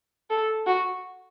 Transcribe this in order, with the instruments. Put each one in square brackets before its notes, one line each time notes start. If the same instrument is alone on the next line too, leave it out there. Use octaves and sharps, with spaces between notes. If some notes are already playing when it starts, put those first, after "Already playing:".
[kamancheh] A4
F#4